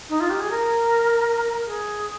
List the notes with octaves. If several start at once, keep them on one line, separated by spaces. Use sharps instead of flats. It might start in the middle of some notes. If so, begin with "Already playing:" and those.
D#4
F4
G4
G#4
A#4
G#4